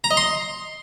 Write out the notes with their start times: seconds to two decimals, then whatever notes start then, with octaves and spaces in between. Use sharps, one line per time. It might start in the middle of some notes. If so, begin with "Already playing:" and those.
0.04 A#5
0.11 D#5
0.17 C6